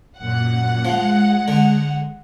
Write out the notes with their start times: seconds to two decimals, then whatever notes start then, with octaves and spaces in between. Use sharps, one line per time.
0.19 F#2 A#2 F#5
0.85 F3 G#3
1.48 D3